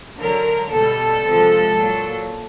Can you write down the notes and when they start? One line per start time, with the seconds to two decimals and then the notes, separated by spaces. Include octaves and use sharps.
0.18 D3 F#3 A#4
0.71 B2 G3 A4
1.24 C3 F3 G#3
1.77 A#2 F#3